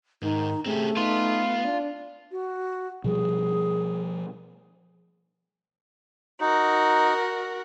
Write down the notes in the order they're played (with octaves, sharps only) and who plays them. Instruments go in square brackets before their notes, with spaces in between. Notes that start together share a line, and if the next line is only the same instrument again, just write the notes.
[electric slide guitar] G#2 [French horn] D#3 [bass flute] D#4
[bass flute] A3 [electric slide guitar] C4 C#4 G4 [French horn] G#4
[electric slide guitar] B3 [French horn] D#4 [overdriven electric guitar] F4
[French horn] D4
[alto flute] F#4
[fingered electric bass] B2 F3 G3 [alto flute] G#4
[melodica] D#4 [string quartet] F#4 A#4